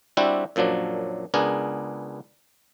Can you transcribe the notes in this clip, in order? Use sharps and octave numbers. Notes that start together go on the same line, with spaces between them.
G3 C4 D4 E4 F#4 G4
F#2 A#2 F3 F#3 D4
C#2 B3 D4 G#4 A#4